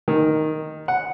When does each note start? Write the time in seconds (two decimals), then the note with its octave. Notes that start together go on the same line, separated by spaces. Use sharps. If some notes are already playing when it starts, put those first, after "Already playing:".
0.08 D#3
0.88 F#5